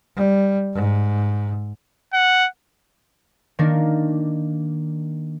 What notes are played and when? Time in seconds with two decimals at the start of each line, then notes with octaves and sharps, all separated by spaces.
0.16 G3
0.74 G#2
2.14 F#5
3.59 D#3 A#3 D4 A#4